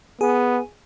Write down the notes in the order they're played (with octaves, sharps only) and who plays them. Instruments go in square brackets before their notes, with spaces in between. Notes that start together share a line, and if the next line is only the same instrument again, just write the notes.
[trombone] B3 [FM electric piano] G#4